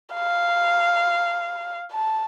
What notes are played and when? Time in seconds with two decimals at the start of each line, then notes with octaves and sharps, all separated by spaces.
0.14 F5
1.92 A5